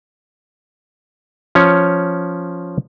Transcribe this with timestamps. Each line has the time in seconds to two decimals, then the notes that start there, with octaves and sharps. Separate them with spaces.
1.55 F3 C#4 C#5